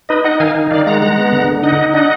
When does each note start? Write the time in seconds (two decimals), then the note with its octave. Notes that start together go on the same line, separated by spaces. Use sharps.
0.09 D#4 B4 D#5
0.24 D#4 D#5 F#5
0.40 D#3 F5 G#5
0.56 D#4
0.71 D#3 D5 F5
0.87 G#3 F#5 A#5
1.02 G#3 F#5 A#5
1.18 B3
1.32 D3
1.48 D3
1.63 D#4 D#5 F#5
1.79 D#4
1.94 D4 D#5 F#5